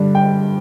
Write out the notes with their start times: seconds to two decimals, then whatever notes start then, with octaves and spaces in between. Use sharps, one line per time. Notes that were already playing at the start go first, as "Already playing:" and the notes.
Already playing: G2 D3 G3 D4
0.15 G5